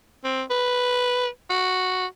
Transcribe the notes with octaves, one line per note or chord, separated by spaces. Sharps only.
C4
B4
F#4